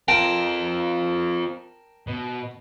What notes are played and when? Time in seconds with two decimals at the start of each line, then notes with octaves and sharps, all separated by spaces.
0.08 C4 F4 A#4 G5 A5
2.07 B2